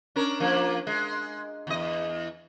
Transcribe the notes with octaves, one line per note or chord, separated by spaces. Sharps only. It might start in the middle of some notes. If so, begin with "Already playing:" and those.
C#4 D4 A#4
F3 A#3 D4
G#3
E2 D#5